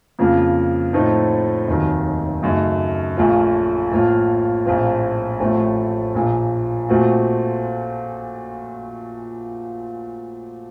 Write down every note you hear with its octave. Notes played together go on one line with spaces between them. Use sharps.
F2 C#3 F3 A#3
A2 F3 A3 C4 D#4
F1 D#2 D#3 F#3
F#2 C#3 A3 D#4
A#1 A#2 A3 C#4 F4
A2 F3 A#3 F4
A#1 A2 F3 C4 F4
A1 A2 F3 A3 C4
A#1 A#2 F3
A#2 A3 C4 F#4